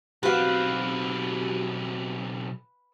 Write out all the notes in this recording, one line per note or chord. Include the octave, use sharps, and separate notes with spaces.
B1 C4 F#4 G4 B4 F5